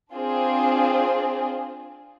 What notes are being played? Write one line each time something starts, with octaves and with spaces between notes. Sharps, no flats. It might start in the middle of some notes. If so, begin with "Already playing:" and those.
C4 D4 F4 G#4 C5